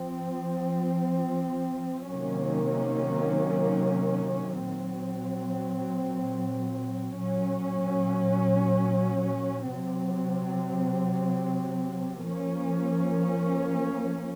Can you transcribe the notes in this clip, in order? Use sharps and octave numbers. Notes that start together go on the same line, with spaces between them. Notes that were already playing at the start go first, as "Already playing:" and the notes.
Already playing: F3 C4
C3 D#3 F#3 A#3 C#4
A#2 F#3 C4
A#2 F#3 C#4
C3 F#3 C4
F3 A#3 C#4